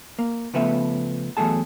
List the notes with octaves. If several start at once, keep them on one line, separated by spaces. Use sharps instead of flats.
A#3
C#3 F3 A3 B3 B4 E5
E2 E3 F#3 A3 G#4 A5